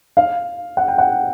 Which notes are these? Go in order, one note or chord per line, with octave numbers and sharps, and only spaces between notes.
F5
F#5
G5
F#5